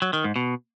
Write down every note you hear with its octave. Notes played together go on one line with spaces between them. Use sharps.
F#3
D#3
G#2
B2